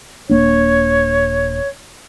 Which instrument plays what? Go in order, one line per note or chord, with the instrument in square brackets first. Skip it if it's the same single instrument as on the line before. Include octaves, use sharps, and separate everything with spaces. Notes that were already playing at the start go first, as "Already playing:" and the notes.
[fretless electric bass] D#1 A#3 D4 [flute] C#5